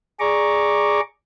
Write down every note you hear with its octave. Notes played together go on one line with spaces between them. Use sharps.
G#4 D5 A#5 C#6 D6